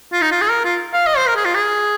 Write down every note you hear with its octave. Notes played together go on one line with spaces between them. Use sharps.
F4
D#4
F4
G#4
A#4
F4
F5
D#5
C5
A#4
G#4
F4
G#4